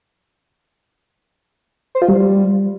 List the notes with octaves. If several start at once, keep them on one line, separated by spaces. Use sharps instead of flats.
C5
F4
G3